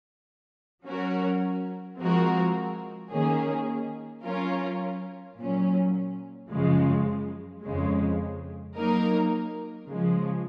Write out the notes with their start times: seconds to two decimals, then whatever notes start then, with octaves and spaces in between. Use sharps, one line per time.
0.85 F#3 C#4 F#4 A#4
1.99 F3 G#3 C4 F#4 A#4
3.12 D#3 A#3 C#4 G#4
4.25 F#3 C#4 F4 A#4
5.38 A#2 F#3 C#4
6.51 F#2 C#3 F3 G#3
7.63 F2 C#3 G#3
8.76 F#3 A#3 D#4 A#4
9.89 C#3 F3 G#3